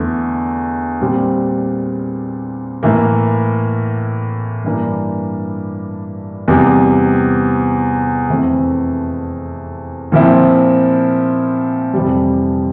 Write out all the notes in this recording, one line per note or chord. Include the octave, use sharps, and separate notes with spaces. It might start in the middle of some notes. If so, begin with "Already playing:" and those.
Already playing: E2 D3 A3
A#2 G3 C4
A2 E3 A#3
G2 E3 A#3 D4
E2 C3 G3
F2 E3 A3 C4
A#2 F3 C4 E4
F2 C3 E3 G3